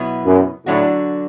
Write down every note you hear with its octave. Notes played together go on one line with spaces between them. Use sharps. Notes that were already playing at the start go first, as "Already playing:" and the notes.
Already playing: B2 F#3 B3 E4
F#2
A2 D3 F#3 D4 F#4